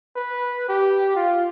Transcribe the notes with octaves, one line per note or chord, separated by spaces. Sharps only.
B4
G4
F4